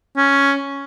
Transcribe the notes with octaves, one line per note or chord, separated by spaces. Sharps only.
C#4